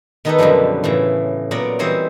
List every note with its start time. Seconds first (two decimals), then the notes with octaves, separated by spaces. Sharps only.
0.25 D#3 B3 D#4 G4 A4 B4
0.39 F#2 B2 D3 F3 G3
0.84 A2 C#3 E3
1.51 A#2 F#3 B3 A#4 C#5 D5
1.79 E3 G3 C4 C5 C#5 D#5